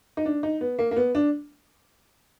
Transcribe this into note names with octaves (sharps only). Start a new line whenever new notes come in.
D#4
D4
D#4
B3
A#3
A#3
B3
D4